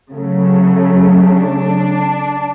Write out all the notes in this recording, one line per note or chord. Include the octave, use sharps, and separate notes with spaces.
C#3 F#3 A3
D4